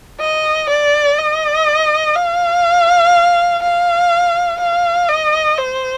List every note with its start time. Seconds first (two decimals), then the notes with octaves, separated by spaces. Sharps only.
0.20 D#5
0.69 D5
1.18 D#5
2.16 F5
3.63 F5
4.60 F5
5.09 D#5
5.58 C5